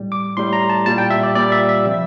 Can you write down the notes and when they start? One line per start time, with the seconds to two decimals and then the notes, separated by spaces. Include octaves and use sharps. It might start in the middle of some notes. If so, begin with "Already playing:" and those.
Already playing: A2 G3
0.12 D6
0.37 A2 G3 C6
0.53 A#5
0.70 A5
0.86 A#2 G3 A5
0.98 G5
1.10 E5
1.23 D5
1.35 A#2 G3 D5
1.52 E5
1.69 E5
1.85 C3 F3